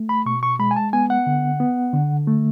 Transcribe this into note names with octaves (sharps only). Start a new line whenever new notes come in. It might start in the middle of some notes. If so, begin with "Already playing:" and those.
Already playing: A3
B5
B2 C#6
C#6
G#3 B5
G#5
A5
B3 G#5
F#5
D3
B3
D3
A3